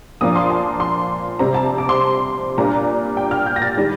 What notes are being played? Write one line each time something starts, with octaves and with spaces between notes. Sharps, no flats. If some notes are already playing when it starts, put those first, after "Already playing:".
A#2 F3 A#3 D4 D#6
C6
A5
C6
C3 G3 C4 A#5
A5
D6
C6
A#2 G3 A#3 D4 A#5
G5
F6
G6
A#6
A6
D#3 G3